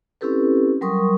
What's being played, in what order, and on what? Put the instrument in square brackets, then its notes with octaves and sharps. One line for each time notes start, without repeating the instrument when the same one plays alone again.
[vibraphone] C4 C#4 E4 G4 A4 B4
F#3 G3 A#4 C6 C#6 D#6